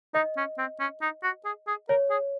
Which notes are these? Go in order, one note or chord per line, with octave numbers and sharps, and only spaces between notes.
D#4 D#5
C#4
C4
C#4
D#4
F#4
G#4
G#4
A#4 C#5
G#4